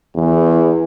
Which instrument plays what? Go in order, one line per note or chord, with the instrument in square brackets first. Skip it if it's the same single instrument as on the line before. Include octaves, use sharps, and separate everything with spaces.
[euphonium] E2